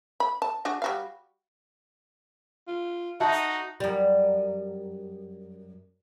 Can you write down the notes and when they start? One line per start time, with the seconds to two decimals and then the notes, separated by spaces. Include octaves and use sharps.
0.20 B5
0.42 A5
0.65 D4 F#4 G#4
0.82 G3 F#4 F5
2.68 F4
3.20 D#4 F#4 E5 A5
3.80 F#2 G3